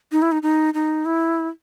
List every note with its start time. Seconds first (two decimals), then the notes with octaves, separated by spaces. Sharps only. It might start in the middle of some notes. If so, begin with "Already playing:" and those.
0.12 D#4
0.22 E4
0.32 D#4
0.43 D#4
0.74 D#4
1.05 E4